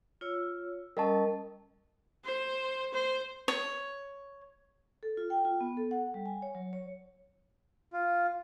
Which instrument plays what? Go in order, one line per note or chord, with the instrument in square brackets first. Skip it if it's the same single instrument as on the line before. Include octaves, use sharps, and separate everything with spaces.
[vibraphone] F4 C#5 E6
[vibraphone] G3 C#4 [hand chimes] A#4 D#5 A5
[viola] C5
C5
[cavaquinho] C#5
[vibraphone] A4
F4
G5
F4
B3
A4
F#5
G3
G#5
C#5
F#3
C#5
[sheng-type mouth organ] F4